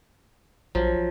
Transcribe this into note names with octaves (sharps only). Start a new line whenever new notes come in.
A#1 F3 F#3